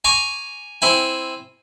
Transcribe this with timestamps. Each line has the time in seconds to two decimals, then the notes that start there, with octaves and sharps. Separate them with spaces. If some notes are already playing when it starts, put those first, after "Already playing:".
0.04 G#5 A#5 C#6 D6
0.82 C4 E4 G#5